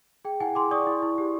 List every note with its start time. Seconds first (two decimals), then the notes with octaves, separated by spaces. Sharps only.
0.25 G#4 G5
0.40 E4 F#5 G#5
0.55 G#4 C6 D6
0.71 D5 C#6 D#6
0.87 E4
1.02 E4
1.18 G4